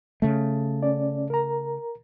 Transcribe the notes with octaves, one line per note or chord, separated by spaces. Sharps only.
C#3 A3
C#4 D5
A#4 A#5